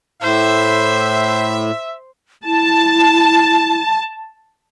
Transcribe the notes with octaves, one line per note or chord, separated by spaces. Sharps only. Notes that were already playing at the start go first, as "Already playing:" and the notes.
A2 C5 E5
E4 A5